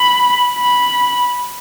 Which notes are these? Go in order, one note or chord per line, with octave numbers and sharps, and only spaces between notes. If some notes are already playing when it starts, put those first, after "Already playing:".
Already playing: B5
B5